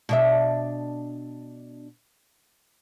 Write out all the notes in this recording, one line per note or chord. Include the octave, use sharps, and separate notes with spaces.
B2 D4 E5